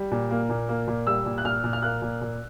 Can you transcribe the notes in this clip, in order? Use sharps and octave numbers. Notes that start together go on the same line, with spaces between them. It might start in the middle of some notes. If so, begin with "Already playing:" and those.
Already playing: G3
A#2
A#3
A#2
A#3
A#2
G3 E6
A#2
F#6
A#2 F6
A#2
F6
A#3 F#6
A#2
A#2